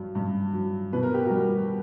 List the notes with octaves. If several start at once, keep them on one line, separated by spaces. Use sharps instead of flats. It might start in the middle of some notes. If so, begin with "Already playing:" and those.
Already playing: G2 F#3
G2
F#3
B2 B4
A#4
G4
G3 F#4 A#4